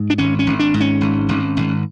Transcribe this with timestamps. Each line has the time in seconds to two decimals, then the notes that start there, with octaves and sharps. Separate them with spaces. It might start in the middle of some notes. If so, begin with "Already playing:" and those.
Already playing: G#2
0.10 D4
0.18 G#1 C#4
0.39 C#4
0.46 G#1
0.60 D4
0.74 G#2
0.81 C#4
1.01 G#1
1.29 G#1
1.57 G#1